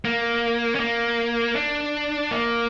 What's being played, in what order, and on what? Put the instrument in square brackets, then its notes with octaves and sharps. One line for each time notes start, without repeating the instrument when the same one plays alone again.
[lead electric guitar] A#3
C#4
A#3
D4
A#3